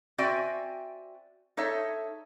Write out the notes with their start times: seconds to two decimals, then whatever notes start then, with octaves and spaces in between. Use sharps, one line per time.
0.18 C4 F#4 D5 E5 G5 G#5
1.57 D#4 A4 C#5 E5